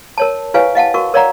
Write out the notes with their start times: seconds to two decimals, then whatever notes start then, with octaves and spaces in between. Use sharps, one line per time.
0.18 A#4 C#5 A5
0.54 E4 G4 B4 C#5 F5 G#5
0.75 D#5 F5 F#5 A5
0.94 F#4 A#4 C#6
1.14 A#4 C#5 D5 F5 F#5 A#5